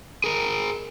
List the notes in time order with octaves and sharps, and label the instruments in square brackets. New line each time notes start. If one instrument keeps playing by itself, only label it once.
[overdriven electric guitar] G#4 A#4